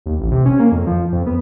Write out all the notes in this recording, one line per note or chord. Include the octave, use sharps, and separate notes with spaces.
D#2
A1
C3
C#4
A#3
F2
F3
F2
B3